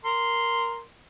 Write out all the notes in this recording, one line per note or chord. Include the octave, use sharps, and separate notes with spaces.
A#4 C6